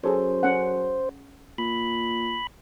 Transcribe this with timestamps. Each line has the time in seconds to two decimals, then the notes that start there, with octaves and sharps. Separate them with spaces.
0.04 F#2 G#4 A4 C5 C#5
0.43 C#4 A4 F#5
1.58 A#2 B5